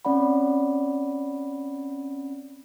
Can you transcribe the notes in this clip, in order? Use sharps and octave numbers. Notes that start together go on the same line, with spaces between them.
C4 C#4 D5 F#5 B5